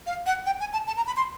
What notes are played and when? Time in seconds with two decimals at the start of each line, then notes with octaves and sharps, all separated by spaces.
0.07 F5
0.26 F#5
0.46 G5
0.60 G#5
0.73 A5
0.87 A5
0.97 A#5
1.07 B5
1.16 C6